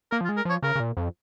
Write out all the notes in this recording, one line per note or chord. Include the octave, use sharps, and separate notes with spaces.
A#3 A#4
F3
F4
G#3
A#4
F3 C#5
C#3 A#4
C#3
A#2
F2